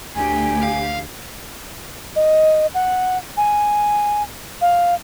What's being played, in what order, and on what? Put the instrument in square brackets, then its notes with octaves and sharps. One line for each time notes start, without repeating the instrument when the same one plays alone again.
[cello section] D2 G4 [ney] G#5
[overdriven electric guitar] F5
[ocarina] D#5
F#5
G#5
F5